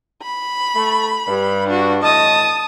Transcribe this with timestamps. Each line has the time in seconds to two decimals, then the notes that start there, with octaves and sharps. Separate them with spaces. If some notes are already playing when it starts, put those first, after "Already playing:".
0.22 B5
0.76 A3
1.28 G2
1.67 D4 F#4
2.02 A2 E3 D#5 A5 D#6